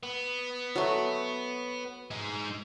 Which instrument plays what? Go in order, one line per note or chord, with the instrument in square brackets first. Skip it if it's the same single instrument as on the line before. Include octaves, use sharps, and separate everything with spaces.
[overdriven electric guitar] B3
[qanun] F#3 A3
[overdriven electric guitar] G#3 D#4